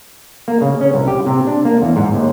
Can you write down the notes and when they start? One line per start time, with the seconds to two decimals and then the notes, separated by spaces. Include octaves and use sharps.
0.48 A#3
0.61 C#3
0.81 C#4
0.94 C2
1.08 G4
1.26 C3
1.47 D4
1.65 A#3
1.82 E2
1.96 G#2
2.14 D#2